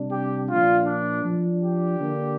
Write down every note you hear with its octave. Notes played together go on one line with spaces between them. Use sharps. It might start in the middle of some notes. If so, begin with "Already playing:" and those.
Already playing: C3 G3 D4
G4
A#2 F3 D4 F4
D4
F3 D4
G4
D3 A#3 D4